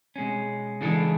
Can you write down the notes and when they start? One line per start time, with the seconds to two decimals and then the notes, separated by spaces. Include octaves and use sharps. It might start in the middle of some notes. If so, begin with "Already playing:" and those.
0.16 B2 G#3 C#4
0.81 C#3 E3 G#3 D4 A4